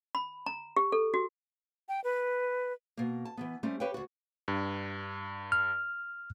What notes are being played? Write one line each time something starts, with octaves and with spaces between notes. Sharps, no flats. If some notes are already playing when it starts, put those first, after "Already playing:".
B5
A#5
G4
A4
F#4
G5
B4
B2 A#3
A5
E3 F3 B3
G3 A3 C4 C#4
G4 B4 C#5 F5 G5
D2 F#4
G2
F6